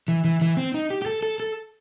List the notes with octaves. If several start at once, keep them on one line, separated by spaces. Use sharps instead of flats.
E3
E3
E3
C4
D#4
G4
G4
A4
A4
A4